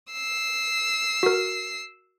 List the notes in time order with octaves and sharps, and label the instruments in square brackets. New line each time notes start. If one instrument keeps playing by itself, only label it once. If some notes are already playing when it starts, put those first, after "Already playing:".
[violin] E6 C7
[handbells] F#4 A#4